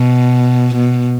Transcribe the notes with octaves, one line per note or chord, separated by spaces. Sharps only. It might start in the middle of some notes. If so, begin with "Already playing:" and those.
Already playing: B2
B2